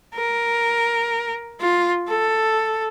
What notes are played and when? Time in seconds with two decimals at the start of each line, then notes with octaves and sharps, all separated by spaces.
0.15 A#4
1.61 F4
2.08 A4